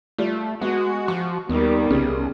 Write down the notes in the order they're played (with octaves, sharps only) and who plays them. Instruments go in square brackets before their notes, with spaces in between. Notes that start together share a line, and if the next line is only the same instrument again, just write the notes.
[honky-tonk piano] G3 F4 [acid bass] A3
[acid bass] G#3 [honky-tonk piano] B3 [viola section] F#4
[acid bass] F3 [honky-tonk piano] C#6
[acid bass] D#2 [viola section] D#3 G3 [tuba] B3
[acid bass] C2 [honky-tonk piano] C#3